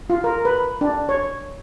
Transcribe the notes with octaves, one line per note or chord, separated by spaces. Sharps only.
F4
A#4
B4
D4
C#5